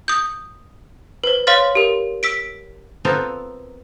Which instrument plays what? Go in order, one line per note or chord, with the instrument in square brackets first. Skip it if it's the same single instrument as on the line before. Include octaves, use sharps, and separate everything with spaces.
[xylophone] D#6 G6
B4 C5
C#5 F5 C6 F6 A6
G4 A#4
E6 B6 D7
[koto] B3 C4 F4 A4 A#4